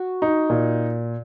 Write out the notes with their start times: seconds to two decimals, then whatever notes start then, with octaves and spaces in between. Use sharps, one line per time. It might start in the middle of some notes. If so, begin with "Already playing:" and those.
Already playing: F#4
0.22 D#4
0.50 A#2